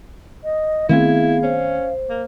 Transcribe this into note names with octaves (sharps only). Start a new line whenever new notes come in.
D#5
D#3 A3 B3 C4 E4 G#4 F5
C#4 C5
A#3